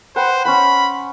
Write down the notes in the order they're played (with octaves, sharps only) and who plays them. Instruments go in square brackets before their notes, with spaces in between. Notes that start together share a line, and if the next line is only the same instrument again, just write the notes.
[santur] B4 F#5 G5 [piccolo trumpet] C5
[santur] C#4 C5 F#5 [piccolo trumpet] B5